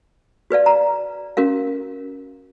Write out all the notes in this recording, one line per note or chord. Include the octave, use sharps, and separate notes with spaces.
F#4 B4 D5 F5
A#5
C#4 F#4 A#4 F5